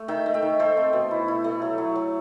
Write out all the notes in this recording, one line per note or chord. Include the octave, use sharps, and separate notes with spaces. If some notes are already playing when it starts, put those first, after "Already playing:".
Already playing: A3
D#3 E5 G5
A3
E5 G5
D#3
A3 A4 C5
C4
B2
E4
E4
A3
F#3
F#3
F#3